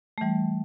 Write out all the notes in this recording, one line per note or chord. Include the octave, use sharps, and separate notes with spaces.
A3
E3 G3